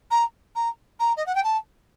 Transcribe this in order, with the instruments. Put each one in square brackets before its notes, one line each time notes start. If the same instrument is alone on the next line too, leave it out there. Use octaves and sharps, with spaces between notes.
[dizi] A#5
A#5
A#5
D#5
F#5
G5
A5